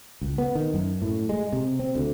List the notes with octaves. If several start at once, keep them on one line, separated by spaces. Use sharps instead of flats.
C#2
B3
D#3
F#2
A2
G#3
C3
C4
D2